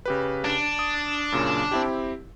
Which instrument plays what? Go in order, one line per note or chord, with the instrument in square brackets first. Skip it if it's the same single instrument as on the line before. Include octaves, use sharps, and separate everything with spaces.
[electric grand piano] C#3 G4 B4
[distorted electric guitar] D4
[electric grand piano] D#6
F#2 A#2 C#3
C4 E4 G4